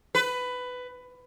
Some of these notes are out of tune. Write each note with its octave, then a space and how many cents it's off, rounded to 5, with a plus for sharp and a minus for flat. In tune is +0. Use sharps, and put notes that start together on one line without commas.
B4 +15